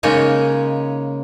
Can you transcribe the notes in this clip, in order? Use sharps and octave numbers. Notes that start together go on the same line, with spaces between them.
C#3 G#3 A#3 D#4 C#5